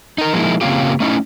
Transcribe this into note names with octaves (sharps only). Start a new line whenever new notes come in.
D#4 A#4
F3 G#3 A#3 C#4 D#4 E4
C#3 A#3 C4 C#4 F4 G4
A3 C#4 D#4 E4